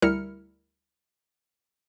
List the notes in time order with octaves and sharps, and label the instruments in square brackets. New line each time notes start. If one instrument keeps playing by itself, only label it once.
[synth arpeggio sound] D2 G3 E4 A#4 F6 C#7